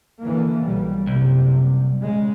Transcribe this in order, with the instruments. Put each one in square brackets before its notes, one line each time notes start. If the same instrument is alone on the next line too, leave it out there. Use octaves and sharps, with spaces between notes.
[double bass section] D3 E3 A#3
B1 G3
[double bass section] F#1 C3 [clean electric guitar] C2
[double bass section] C#3 G#3